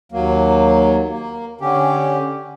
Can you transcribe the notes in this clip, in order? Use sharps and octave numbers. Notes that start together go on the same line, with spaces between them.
D#2 F#3 A#3
A#3
D3 C#4 G4